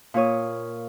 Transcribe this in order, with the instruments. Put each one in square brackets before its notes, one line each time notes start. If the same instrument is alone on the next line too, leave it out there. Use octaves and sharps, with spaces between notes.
[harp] A#2 F4 C#5 D#6